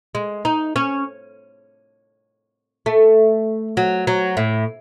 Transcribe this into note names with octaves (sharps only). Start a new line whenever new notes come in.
G#3
D#4
C#4
A3
F#3
F#3
A2